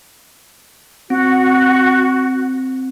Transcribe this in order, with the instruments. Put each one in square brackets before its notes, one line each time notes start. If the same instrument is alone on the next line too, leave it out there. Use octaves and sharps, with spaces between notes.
[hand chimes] C4 [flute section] F#4